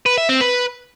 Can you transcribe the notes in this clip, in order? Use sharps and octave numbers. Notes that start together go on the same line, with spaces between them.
B4
E5
C4
B4